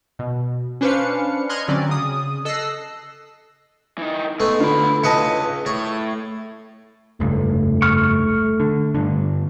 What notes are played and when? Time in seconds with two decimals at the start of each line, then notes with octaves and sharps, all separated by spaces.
0.19 B2
0.81 C#4 D4 B4 C5 F5 C#7
1.49 D#5 C6 F6 F#6 G#6
1.68 D3 F#3 C4 C#4 D5
1.89 C#3 D#6
2.45 A4 D#5 E6 F#6 A#6 C7
3.98 E3 D#4
4.40 G#3 A3 B3
4.60 D3 F4 B5
5.03 C#2 E4 B4 D#5 A5 C#7
5.66 A2 C#5
7.20 F1 C#2 G2 A3
7.82 C#6 F6
8.60 D3
8.94 G2 D3